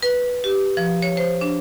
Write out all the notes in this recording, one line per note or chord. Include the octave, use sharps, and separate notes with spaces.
B4
G4
F3
C#5
C5
D4